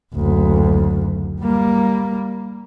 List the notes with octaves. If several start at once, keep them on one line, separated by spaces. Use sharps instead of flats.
F#1 D2
G3 A#3